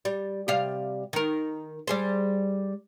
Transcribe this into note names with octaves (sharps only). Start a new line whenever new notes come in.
G3
C3 G3 F5
D#3 A#4
G3 G#4 C5